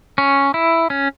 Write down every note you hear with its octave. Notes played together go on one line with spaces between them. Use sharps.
C#4
E4
C#4